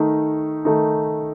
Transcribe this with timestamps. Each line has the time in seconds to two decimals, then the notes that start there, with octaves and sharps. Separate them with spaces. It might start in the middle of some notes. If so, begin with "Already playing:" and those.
Already playing: D#3 A3 D#4
0.65 D#3 A3 D#4